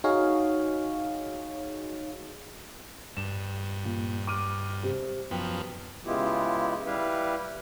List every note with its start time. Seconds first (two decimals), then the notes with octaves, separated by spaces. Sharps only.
0.04 D#4 F#4 G#4 C#5 D#5 F5
3.17 G2 E7
3.85 A#2
4.27 D6 F6 D#7
4.83 C3
5.31 F#2 F3 B3 G5
6.06 C#3 G#3 B3 E4 F4 G4
6.86 G3 E4 G4 B4 F5